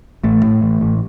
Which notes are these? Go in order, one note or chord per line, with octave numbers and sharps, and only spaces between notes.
A1 A3
A2
A1
A1